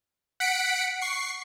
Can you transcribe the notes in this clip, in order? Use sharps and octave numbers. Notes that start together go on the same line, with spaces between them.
F#5 B6 C#7 D7
C#6 C7